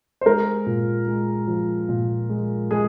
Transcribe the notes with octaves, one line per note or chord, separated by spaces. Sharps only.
C5
G#3 A#4
A#2
G#3
F3
A#2
G#3
G#3 G#4